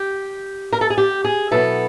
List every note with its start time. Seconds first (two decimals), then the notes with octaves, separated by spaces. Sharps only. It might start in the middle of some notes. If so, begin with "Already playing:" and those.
Already playing: G4
0.73 A#4
0.81 A4
0.90 G#4
0.98 G4
1.25 G#4
1.51 B2 F#3 B3 E4 A4